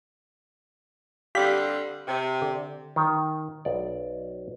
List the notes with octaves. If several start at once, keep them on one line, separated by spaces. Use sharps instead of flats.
D3 G3 C4 G4 F5 B6
C3
D3
D#3
B1 D5